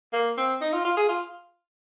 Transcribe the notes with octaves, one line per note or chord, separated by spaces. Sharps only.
A#3
C4
D#4
F4
F4
G#4
F4